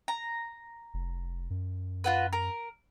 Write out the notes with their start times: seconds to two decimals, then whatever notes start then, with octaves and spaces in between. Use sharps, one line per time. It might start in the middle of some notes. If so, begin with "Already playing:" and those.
0.08 A#5
0.94 F1
1.50 F#2
2.04 F4 F#4 B4
2.33 A#4